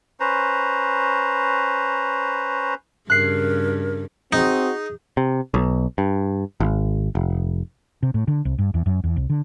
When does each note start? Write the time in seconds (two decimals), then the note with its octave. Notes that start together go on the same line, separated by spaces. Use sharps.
0.20 C#4 B4 C5 A#5
3.10 G2 C#3 A#4 F#6 C7
4.33 C4 D#4 F#4 G#4
5.17 C3
5.54 B1
5.98 G2
6.60 G#1
7.15 F1
8.03 C3
8.14 A2
8.28 D3
8.45 C2
8.58 G2
8.74 E2
8.86 F#2
9.04 E2
9.16 C2
9.30 D3